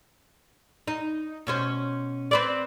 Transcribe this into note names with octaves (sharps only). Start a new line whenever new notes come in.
D#4
B2 C#4 C5
C4 B4 D5